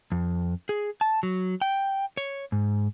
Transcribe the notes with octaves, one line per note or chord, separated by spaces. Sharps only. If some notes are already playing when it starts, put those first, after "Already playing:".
F2
G#4
A5
F#3
G5
C#5
G#2